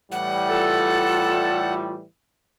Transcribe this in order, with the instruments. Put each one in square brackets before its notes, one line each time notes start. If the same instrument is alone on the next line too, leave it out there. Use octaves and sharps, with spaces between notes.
[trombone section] A2 E3 G3 [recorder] F#5
[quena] F4 [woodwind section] A4